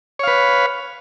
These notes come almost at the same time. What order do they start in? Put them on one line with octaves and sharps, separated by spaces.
C#5 F5 B4